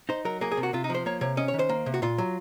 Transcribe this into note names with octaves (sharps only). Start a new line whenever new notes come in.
D#4 C5
F#3 A#4
A#3 G#4
G#4
C3
F#4
C3 F4
D#4
F3 C5
A#3 C#5
C3 C#5
C#4 D#5
C#5
D#3
C5
A#3
C3
F#4
A#2 F4
F#3